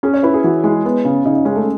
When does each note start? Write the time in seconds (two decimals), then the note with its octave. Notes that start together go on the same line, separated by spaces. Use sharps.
0.03 C#4 G#4
0.14 C#5
0.23 E4 B4
0.34 G#4
0.44 E3 F#4
0.64 G#3 E4
0.85 B3
1.05 C#3
1.25 C#3 D#4
1.36 D#4
1.45 G#3 C#4
1.56 A3